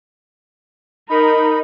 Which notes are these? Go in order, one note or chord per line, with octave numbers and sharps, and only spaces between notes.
D#4 A#4 B5